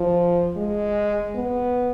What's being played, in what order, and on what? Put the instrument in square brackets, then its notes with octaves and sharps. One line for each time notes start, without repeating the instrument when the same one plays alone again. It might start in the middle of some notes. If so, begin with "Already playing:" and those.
Already playing: [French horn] F3
G#3
B3